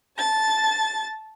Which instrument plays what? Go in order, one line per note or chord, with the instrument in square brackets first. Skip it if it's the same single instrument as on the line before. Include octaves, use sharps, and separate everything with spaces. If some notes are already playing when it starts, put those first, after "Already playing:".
[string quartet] A5 A6